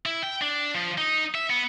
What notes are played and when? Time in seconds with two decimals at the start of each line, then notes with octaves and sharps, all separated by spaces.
0.06 E4
0.23 G5
0.42 D4
0.74 F3
0.98 D#4
1.35 E5
1.50 B3